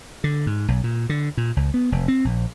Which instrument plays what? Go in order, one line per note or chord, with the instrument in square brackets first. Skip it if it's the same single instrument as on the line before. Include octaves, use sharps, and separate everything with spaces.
[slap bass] D3
G#2
B1
A#2
D3
A#2
C#2
B3
F1
C4
A#1